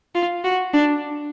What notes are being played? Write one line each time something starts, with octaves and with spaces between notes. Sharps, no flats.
F4
F#4
D4